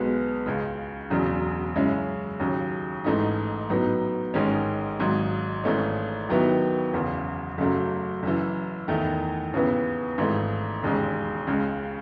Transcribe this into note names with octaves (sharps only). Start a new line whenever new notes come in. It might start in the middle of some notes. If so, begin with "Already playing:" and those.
Already playing: B1 B2 G#3 B3
C#2 C#3 G#3
E1 E2 C#3 F#3
F#2 C#3 G#3 C#4 E4
D#2 C#3 F#3
A1 G#2 E3 A3 D#4
A2 F#3 B3 D#4
A1 G#2 D#3 G#3 C#4
G#1 G#2 F#3
G#1 G#2 E3 A3 C#4
D#2 D#3 F#3 B3 E4
F#1 E2 C#3
F#1 F#2 C#3 F#3 A3
F#1 F#2 E3
E2 D#3 A3 E4
D#2 C#3 E3 B3
G#1 G#2 E3 A3
E1 D#2 C#3 G#3
C#2 C#3 G#3